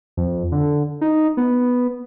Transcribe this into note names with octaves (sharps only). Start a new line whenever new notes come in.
F2
D3
D#4
B3